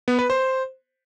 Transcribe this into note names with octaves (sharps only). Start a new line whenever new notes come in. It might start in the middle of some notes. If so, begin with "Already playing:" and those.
B3
B4
C5